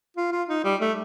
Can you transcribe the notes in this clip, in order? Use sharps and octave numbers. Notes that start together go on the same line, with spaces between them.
F4
F4
D#4
G3
A3